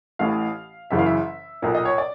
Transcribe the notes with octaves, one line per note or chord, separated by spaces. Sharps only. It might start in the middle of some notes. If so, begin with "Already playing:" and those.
A1 A2 E3 F5
F#1 F#2 C#3 E3 E5
F5
E5
B1 A#2
D#5
C#5
D5